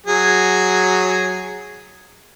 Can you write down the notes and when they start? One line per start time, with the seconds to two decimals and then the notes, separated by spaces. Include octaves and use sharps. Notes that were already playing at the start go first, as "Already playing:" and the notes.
0.06 F#3 G#4